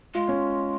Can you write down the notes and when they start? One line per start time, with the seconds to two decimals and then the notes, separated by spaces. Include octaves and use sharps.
0.14 G#3 F4
0.28 C#4